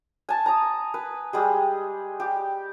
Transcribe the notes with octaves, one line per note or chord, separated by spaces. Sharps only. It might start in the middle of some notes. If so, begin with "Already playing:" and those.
G#5 A5
A#5 D#6
B4
G3 G#3 G#4
G4